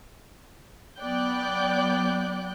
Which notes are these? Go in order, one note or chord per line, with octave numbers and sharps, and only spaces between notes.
F#3 B3 D5 G5 F#6 G6